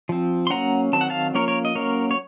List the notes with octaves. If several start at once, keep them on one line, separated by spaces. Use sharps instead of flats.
F3 C4
C6
F#3 A#3 C#4 F#5 A#5
D#3 F#3 C4 A5
F#5
F5 A5
F3 A#3 C#4 A#4 C#5
A#4 C#5
D#5
F#3 A#3 C#4 A#4 C#5
C#5